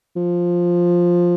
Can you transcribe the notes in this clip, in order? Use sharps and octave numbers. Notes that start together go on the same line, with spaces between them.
F3